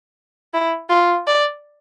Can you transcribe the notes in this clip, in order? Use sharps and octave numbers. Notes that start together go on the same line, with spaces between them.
E4
F4
D5